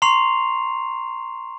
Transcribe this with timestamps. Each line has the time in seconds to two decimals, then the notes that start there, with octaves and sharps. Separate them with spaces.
0.02 A#5 C6 C#6 C7 F7